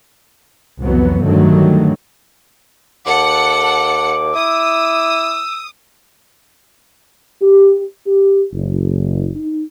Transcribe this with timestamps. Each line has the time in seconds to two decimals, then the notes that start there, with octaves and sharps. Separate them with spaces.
0.81 C2 F2 E3 F#3 B3
1.24 G2 D3 D#3 F#3 G3 A3
3.06 D#2 A4 F#5 D6 C#7
4.35 E4 D#6 E6
7.42 G4
8.06 G4
8.53 F#1
9.35 D#4